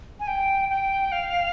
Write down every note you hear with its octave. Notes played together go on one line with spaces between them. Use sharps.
G#5
G5
G5
F5